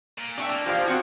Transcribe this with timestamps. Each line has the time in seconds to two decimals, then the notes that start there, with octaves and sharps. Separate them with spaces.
0.18 A#2
0.38 D4 E5 G5 C#6 D6
0.49 A#3 A5
0.66 E3 F3 G4 F5
0.88 C4 F4 F#4 F#5 G5